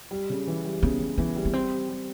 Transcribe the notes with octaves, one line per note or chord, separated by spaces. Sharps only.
G3
C#3
E3
G3
C#3 B3
C#3
E3 B3
G3
B3
G3 C4
G4
G3